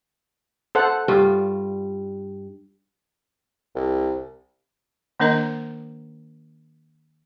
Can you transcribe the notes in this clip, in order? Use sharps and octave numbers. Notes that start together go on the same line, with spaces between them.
A4 C5 F#5
G2 G3 F4
C2
D#3 A#3 D4 A#4 D#5 A#5